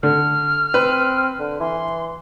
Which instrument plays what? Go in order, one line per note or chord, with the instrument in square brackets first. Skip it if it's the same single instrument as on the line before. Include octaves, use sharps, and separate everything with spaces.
[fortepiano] D3 [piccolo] F6
[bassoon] C4 [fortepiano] B4
[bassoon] D3
[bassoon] E3 [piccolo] C6